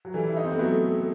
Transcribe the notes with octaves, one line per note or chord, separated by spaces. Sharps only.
F#3
E3 G3 A4
E4
D#4
C4
B3
F#3 A3